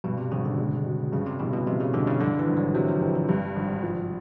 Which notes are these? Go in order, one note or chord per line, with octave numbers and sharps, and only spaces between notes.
G2 B2
C3
G#1 C#3
D3
G#3
B2
G2 C#3
C3
A1 B2
B2
G2 C3
C#3
A1 D3
C#3
G2 D3
E3
G#1
F#3
C3 F#3
F3
F2 E3
D3
G2 C3
G#1
F3